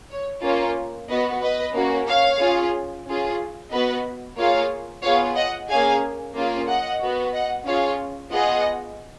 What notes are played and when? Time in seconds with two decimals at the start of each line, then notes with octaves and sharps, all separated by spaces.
0.11 C#5
0.44 A#3 C#4 F4 C#5
1.09 B3 F#4 B4 D#5
1.42 B4 D#5
1.75 A#3 C#4 F#4
2.08 C#5 F5
2.41 C#4 F4 G#4
3.06 C#4 F4 G#4
3.72 B3 F#4 B4 D#5
4.38 A#3 F4 G#4 C#5 F5
5.03 B3 F4 G#4 C#5 F5
5.37 D#5 F#5
5.69 A#3 C#4 G#4 F5 G#5
6.36 A#3 C#4 F4 G#4
6.68 D#5 F#5
7.01 B3 F#4
7.33 D#5 F#5
7.66 C#4 F4 G#4 C#5 F5
8.32 B3 F4 G#4 D#5 F#5